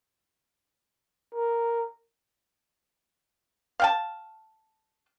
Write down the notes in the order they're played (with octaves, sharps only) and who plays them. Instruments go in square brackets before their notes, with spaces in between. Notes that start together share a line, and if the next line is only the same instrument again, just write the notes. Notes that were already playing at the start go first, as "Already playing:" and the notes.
[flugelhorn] A#4
[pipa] F5 G5 A5